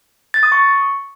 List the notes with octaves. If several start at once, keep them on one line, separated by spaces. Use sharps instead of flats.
A6
D#6
C#6